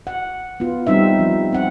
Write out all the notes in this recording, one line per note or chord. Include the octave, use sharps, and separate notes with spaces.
F#5
B3 F4
G3 C4 D#4 E5
F3
C4 F#5